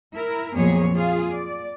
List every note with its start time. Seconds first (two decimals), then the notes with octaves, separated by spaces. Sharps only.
0.14 E4 A#4
0.55 F2 A#2 F#3 B3 G#4 C#5
0.94 F4 G#4 F5
1.33 D5